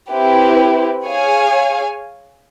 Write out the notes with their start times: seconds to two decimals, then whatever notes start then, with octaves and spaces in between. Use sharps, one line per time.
0.10 C4 E4 G4 B4
1.05 G#4 C#5 F5 G#5